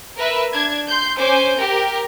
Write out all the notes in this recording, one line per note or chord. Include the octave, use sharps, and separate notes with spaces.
A#4 B4 E5
D4 G#6
C6 G6
C#4 C5 G#5 D6 G6
G4 A#4